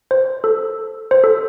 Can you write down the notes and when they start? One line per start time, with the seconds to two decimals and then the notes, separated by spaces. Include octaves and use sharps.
0.11 C5
0.44 A4
1.11 C5
1.24 A4